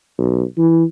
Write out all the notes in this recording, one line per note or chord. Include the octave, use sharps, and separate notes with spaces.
B1
E3